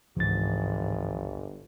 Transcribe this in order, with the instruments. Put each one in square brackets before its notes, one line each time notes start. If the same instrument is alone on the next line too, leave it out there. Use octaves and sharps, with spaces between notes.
[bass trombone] G1 [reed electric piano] C#2 A6 [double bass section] G#2 [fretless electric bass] E3 F3